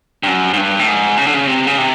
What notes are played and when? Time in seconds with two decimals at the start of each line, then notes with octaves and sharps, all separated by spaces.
0.23 G2
0.27 F#2
0.53 G#2
0.57 G2
0.79 A2
0.87 G#2
1.18 C#3
1.26 D3
1.34 C#3
1.47 C3
1.67 C#3
1.78 C3